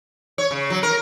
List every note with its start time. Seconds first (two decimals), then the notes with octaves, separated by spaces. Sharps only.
0.38 C#5
0.51 C#3
0.70 F#3
0.83 A#4